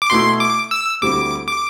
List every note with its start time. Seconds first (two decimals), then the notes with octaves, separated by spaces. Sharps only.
0.02 D6
0.10 B2 A3 E4 C6
0.40 D6
0.71 E6
1.01 D2 D3 G3 C4 E4 D6
1.48 D6